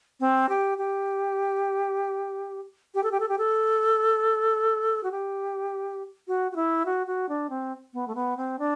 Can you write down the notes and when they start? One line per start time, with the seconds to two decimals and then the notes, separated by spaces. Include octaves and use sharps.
0.20 C4
0.49 G4
0.78 G4
2.95 G4
3.03 A4
3.12 G4
3.20 A4
3.29 G4
3.38 A4
5.04 F#4
5.12 G4
6.28 F#4
6.52 F#4
6.56 E4
6.85 F#4
7.07 F#4
7.29 D4
7.50 C4
7.93 B3
8.08 A3
8.15 B3
8.37 C4
8.59 D4